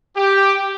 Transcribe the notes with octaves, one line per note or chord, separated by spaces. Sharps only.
G4